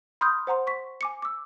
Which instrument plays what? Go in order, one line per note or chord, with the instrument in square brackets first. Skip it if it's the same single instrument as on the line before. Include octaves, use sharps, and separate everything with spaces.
[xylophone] B5 C6 D#6 F6 G6
C5 F#5 A#5 C6
C#6 B6
G#5 D6 C#7
D6 E6